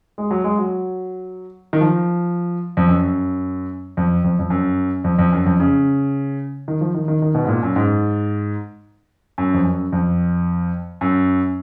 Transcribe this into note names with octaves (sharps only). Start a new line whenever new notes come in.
G#3
F#3
G#3
F#3
D#3
F3
F2
F#2
F2
F2
F2
F#2
F2
F2
F#2
F2
C#3
D#3
F3
D#3
D#3
D#3
B2
G#2
A#2
F#2
G#2
F#2
F2
F#2
F2
F#2